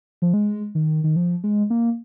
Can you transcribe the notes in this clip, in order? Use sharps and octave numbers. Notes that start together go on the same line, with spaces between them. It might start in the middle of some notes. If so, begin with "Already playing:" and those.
F3
G#3
D#3
D#3
F3
G#3
A#3